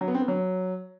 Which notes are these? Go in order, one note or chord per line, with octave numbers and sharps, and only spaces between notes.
F#3
B3
C4
B3
F#3